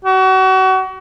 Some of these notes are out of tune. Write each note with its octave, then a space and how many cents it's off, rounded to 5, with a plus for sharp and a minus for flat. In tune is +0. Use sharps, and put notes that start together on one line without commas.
F#4 +35